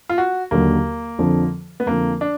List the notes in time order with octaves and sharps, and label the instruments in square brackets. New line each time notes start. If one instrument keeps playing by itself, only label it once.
[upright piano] F4
F#4
[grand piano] D#2 D3 F#3 [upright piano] A#3
[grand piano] F2 D3 F3
[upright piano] B3
[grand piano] F2 D3 F3 [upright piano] A#3
[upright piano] D4